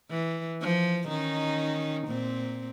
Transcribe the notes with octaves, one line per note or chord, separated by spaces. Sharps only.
E3
F3
D#3 C#4 D#4
A#2 C4